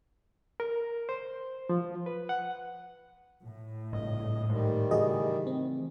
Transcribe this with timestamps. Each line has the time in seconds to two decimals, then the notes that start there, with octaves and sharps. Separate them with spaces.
0.60 A#4
1.09 C5
1.69 F3
2.06 B4
2.29 F#5
3.44 A2
3.93 G#1 C#2 G2 D#5
4.50 G#2 D#3 G3
4.91 C#3 E3 A3 F#4 G#4 D#5
5.47 C4